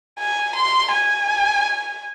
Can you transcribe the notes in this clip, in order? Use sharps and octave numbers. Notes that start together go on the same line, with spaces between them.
G#5
C6
G#5